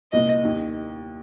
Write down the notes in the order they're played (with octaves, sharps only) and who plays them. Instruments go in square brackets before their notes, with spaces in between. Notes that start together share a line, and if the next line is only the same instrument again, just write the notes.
[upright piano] C2 A#2 A#3 [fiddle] D#5
[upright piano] D#2 D#3 A#3